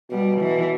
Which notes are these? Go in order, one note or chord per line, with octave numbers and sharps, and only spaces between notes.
B2 G3
E3